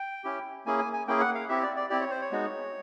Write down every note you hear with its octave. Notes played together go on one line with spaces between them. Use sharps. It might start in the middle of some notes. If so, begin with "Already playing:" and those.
Already playing: G5
C#4 E4 G4
A#3 C#4 E4 G#4 G#5
G#5
G#5
A#3 C#4 E4 G#4 G5
F#5
F5
C4 E4 G4 E5
D5
D5
C4 E4 G4 D5
C#5
C5
C#5
G#3 B3 D#4 F#4